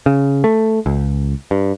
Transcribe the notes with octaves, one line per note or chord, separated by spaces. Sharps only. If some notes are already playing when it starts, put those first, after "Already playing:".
C#3
A3
C#2
G2